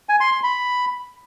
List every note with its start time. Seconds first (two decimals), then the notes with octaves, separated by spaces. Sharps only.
0.09 G#5
0.21 C6
0.32 C6
0.43 B5